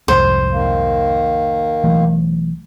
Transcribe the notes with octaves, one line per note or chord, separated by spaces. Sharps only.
C2 F2 G#2 C5
D#3 A#3
B1 E3 A3